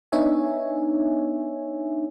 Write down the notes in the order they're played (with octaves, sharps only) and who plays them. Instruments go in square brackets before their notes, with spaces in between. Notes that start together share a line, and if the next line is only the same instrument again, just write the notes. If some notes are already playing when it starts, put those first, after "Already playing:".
[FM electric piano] B3 D4 D#4 C#5 E5 G#5